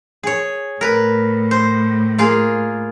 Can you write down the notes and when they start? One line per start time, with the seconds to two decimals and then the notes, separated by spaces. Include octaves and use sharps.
0.23 G#4 C#5
0.81 A2 A#4 B4
1.51 C5
2.18 A#3 F4 G#4